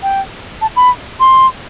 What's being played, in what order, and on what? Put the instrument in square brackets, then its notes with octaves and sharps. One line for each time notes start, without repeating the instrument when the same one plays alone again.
[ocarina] G5
A5
B5
C6